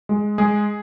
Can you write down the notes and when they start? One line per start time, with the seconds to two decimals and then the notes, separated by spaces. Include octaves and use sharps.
0.09 G#3
0.38 G#3 G#4